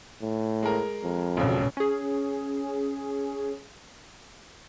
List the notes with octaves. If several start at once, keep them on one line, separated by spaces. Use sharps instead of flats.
A2
G#3 A#4
F2
E1 C#2 B2 C#4
C#4 G#4